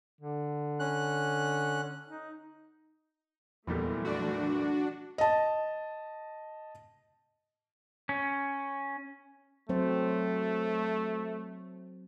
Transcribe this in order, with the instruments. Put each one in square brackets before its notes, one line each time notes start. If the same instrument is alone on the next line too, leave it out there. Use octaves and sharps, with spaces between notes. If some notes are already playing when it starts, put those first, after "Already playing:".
[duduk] D3
[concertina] C#4 F#6
[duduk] D#4
[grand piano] F1 A#2 G3 [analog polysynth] E2 [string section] E3 F#3 A3
[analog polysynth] D4 F#4
[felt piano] D#5 A5
[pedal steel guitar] C#4
[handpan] F#3 C4 C5 [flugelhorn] A3